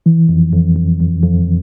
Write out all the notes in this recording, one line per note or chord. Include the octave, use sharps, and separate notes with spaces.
E3
F2
F2
F2
F2
F2